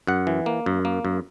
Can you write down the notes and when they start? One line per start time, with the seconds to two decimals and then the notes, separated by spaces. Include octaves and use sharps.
0.07 F#2 F#5
0.27 E3
0.46 A#3
0.66 F#2
0.85 A#3
1.05 F#2